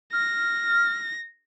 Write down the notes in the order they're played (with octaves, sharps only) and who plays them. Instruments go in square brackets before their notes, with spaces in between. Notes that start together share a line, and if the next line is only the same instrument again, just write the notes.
[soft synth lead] F6 [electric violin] A#6